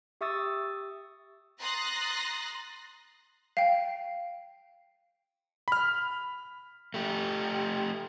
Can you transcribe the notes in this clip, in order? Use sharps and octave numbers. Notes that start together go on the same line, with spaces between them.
G4 E5 C#6 D#6 E6 A6
A#5 C6 D#6 F#6 A6 A#6
F5 G5
B5 F6
A3 G4